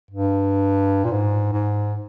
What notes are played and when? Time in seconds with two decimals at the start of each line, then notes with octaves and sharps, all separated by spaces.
0.10 G2
1.04 A#2
1.11 G#2
1.53 G#2